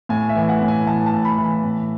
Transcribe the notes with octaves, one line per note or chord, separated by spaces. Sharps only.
A2 G#5
E5
E3
F#5
A2
G#5
E3 A5
A5
A2
B5
E3
B5
A2